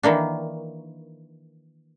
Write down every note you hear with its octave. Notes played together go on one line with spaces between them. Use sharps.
D#3 E3 A#3 D4